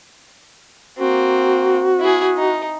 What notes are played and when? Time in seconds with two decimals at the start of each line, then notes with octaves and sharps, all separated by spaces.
0.99 A#3 C4 F#4
2.00 E4 G#4
2.37 D#4